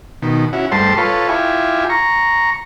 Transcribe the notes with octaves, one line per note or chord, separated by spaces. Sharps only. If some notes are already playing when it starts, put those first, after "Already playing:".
B2 D#3
C#4 E4 F#4
G2 G3 A3 C5 A5 C6
F4 A4 B4 C#5
E4 F4 G4 G#5
A#5 C#6